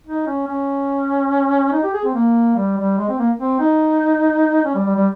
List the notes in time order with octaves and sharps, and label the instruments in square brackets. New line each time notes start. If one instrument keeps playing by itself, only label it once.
[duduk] D#4
C#4
C#4
D#4
G4
G#4
C4
A#3
G3
G3
G#3
C4
A#3
C4
D#4
C#4
G3
G3
G3